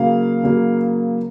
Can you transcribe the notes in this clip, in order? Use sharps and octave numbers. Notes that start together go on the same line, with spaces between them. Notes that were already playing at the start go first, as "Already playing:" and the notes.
Already playing: C#3 F#3 A#3 F5
C#3 F#3 A#3